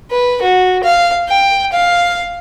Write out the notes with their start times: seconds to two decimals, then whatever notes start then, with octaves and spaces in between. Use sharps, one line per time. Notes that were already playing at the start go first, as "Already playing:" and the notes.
0.11 B4
0.42 F#4
0.84 F5
1.29 G5
1.73 F5